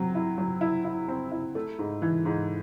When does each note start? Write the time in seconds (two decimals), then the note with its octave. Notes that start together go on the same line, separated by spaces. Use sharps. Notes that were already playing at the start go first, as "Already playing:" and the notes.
Already playing: F#3 C4
0.15 E4
0.38 F#3
0.61 E4
0.85 E4
1.08 C4
1.32 E4
1.55 A3
1.79 G#2
2.02 E3
2.25 G#2